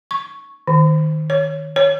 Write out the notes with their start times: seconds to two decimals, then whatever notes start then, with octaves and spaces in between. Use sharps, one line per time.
0.11 C#6
0.67 D#3
1.30 C#5
1.76 C#5